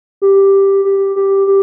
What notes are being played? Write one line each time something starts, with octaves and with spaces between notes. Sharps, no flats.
G4
G4
G4
G4